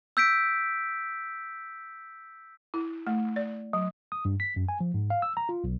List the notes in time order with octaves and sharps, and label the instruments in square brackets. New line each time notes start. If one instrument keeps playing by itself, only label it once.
[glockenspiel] E6 G6 B6 D7
[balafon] E4
A3
D5
F#3
[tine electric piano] D#6
G2
B6
F#2
G#5
F3
G#2
F5
E6
A#5
F4
B1